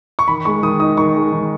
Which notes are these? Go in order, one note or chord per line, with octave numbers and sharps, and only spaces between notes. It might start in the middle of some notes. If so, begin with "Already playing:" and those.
C#6
D#3 B5
G#3 C#6
D#3 D#6
D#4 D#6
D#3 C#6
G#3
D#3